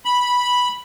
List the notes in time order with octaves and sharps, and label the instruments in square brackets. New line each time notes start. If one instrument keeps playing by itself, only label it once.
[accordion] B5